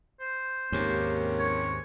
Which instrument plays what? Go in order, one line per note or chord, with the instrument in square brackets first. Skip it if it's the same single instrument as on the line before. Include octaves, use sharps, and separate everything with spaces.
[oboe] C5
[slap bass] D#2 G#2 [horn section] C3 C#4 G4 [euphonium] A#3
[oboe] C#5